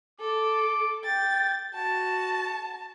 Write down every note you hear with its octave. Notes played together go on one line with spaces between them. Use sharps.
A4 D6
G5 A6
F#4 A5